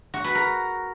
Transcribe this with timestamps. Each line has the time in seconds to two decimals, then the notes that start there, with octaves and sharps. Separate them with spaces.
0.14 F#4
0.24 B4
0.35 A#4